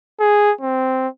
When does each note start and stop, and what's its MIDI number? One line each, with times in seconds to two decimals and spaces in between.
0.20 0.52 68
0.61 1.08 60